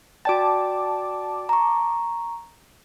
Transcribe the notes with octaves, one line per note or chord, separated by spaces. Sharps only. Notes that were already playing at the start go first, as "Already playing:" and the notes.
F#4 D5 G5 A5 D6
A#5 C#6